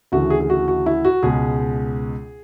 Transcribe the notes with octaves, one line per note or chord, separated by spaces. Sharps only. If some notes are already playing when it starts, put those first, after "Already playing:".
D2 C#3 E3 F#4
G#4
G#4
F#4
F#4
E4
F#4
C#2 B2 G#3 G#4